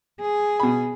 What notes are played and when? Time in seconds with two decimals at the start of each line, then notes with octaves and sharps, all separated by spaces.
0.21 G#4
0.60 B2 B5